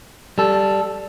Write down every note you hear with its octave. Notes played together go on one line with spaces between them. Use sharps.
G3 A4